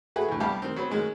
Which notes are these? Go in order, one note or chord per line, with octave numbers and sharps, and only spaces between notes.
A3 F#4 G#4 B4
D2 E3
C2 G3 B3 G4 F5 A5
D#3 C4
F#3 B3 C4
D#3 F#3 G#3 C#4